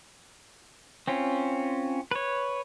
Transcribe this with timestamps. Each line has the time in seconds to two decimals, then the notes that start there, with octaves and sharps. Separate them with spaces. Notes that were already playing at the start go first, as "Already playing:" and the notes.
1.07 C4 C#4 F4
2.11 B4 C#5